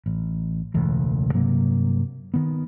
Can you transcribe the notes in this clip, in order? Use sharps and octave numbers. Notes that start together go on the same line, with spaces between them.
A1
E1 C#2 A2 E3
G2 C3 F#3 A#3
D#3 B3